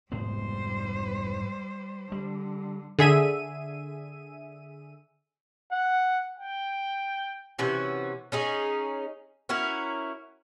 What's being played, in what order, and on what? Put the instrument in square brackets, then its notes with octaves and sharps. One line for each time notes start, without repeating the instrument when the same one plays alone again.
[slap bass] F1 G#2 B3 [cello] G3 C5
[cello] D3 [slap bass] G3
[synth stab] D3 G#4 E5 D#7
[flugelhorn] F#5
G5
[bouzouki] C3 E3 C#4 F#4
C#4 D#4 G#4
C#4 E4 F#4 A#4